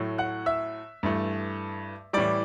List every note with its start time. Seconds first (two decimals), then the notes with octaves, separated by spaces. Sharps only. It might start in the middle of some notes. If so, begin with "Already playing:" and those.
Already playing: A2 F#3 A3
0.18 F#5 F#6
0.46 E5 E6
1.03 G2 E3 A3
2.13 A2 E3 G3 D5 D6